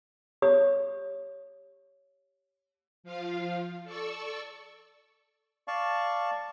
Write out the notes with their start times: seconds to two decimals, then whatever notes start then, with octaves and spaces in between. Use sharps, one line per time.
0.42 G4 C#5 D#6
3.04 F3 F4 F5
3.84 A4 D5 C#6 E6
5.68 D5 F5 A5 C#6